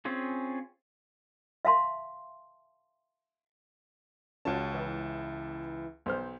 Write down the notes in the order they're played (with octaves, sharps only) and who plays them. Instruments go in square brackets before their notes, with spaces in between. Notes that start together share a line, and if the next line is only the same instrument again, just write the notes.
[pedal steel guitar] C4 C#4 F4 G#4
[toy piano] E5 F5 A5 C6
[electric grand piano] C#2 A5 [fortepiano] C#4 F4 F#4
[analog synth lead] E3
[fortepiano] B1 C5 F6